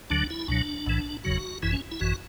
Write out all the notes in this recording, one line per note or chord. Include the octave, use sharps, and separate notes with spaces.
D2 D3 F#3 D4
E4
C#2 B2 F#3 D4
B1 A2 E3
F#1 E2 C#3 F#3 F#4
G#1 F#2 E3 E4
C#4
E4
G#1 F#2 E3 F#4